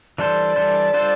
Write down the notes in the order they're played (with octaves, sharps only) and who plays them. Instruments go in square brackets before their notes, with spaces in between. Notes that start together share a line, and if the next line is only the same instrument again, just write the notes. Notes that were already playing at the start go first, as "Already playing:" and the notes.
[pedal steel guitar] E3 G3 D4 A4 C5 [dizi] D5
[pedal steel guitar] E3 G3 D4 A4 C5
G3 D4 F4 A4 C5